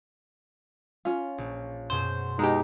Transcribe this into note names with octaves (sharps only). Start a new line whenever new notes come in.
C#4 F4
A#1
F#2 B2 G#4 C5
B2 G#3 D#4 E4 G4 E5 A#5